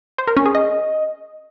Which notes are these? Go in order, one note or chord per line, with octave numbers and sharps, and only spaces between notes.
C5
A#4
C#4
G#4
D#5